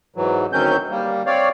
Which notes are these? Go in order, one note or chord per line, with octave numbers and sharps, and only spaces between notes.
G#2 E3 F#3
D2 D#3 F#3 C4 C#4 G6
G3 A#3
C4 C#5 D5 F5